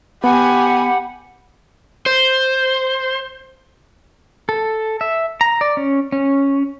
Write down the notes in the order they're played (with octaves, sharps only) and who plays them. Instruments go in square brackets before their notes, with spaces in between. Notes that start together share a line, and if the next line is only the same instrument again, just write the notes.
[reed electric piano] B3 [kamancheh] G4 B5 [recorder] F#5 [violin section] G#5
[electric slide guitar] C5
[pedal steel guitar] A4
E5
A#5
D5
C#4
C#4